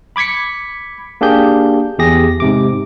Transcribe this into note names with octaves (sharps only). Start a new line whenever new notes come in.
B5 D6 G#6 B6 C#7
A#3 D4 G4 G#4 G6
E2 G4 G#4 A#6
G#2 C3 D6